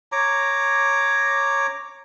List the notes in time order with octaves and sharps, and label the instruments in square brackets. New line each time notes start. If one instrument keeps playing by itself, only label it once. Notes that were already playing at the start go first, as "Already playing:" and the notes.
[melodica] C#5 A#5 D6